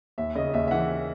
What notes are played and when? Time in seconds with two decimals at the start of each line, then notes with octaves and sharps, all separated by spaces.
0.18 D#2 E5
0.35 C#3 D#5
0.53 D#2 E5
0.68 E5
0.71 E3 F#5